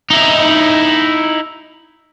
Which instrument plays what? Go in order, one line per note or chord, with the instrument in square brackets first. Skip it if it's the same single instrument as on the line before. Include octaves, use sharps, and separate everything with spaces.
[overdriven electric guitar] D#4 E4